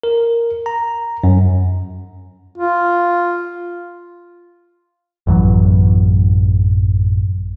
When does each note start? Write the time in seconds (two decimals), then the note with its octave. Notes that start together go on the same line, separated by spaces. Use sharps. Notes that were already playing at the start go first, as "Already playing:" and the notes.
0.03 A#4
0.66 A#5
1.24 F#2
2.58 F4
5.27 A1 F#2 E3 F#3